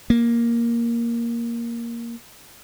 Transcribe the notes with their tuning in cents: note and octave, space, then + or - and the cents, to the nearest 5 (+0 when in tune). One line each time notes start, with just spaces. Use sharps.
A#3 +5